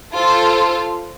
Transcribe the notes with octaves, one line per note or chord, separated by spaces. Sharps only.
F4 A4 C5